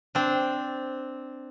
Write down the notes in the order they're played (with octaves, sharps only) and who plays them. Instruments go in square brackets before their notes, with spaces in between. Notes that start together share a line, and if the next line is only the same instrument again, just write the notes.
[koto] C4 D4